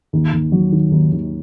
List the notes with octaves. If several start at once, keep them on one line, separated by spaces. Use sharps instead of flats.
D#2
D#2
F#3
D#3
D#2
D#2